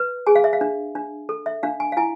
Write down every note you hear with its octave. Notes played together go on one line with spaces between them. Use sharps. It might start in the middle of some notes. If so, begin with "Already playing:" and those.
Already playing: B4
G#4 G#5
F5
E5
F5
D4
D4
A4
E5
D4 F5
G#5
F5
E4 G#5